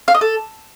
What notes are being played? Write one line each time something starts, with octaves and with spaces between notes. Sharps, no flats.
F5
D#5
A4